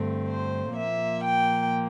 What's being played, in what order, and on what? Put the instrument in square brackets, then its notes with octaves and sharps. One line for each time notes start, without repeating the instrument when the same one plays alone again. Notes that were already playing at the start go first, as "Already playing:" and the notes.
Already playing: [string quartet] G2 D3 A3 C4
C5
A#2 F3 A#3 E5
G5